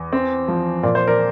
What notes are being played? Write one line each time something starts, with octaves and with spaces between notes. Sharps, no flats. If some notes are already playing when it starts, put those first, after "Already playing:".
Already playing: E2
C4
F3
A#2 D5
C5
A#4 D5